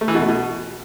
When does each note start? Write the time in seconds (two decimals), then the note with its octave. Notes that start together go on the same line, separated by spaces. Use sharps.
0.01 A3
0.08 E3
0.15 B2
0.22 A3
0.28 B2